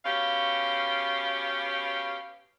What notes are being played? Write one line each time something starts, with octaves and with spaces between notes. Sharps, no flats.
B2 C#4 G4 F5